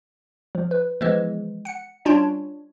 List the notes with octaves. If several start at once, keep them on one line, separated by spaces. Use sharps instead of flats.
F3
B4
E3 F3 G#3 B3
F#5 C#7
G3 C#4 D4 F4 C#5